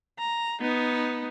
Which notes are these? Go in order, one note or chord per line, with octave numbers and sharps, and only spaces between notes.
A#5
B3 D#4